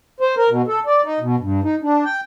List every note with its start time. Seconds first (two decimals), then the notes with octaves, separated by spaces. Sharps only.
0.21 C5
0.37 A#4
0.49 B2
0.68 A4
0.86 D5
1.05 D#4
1.20 B2
1.40 G2
1.64 D#4
1.82 D4
2.05 G5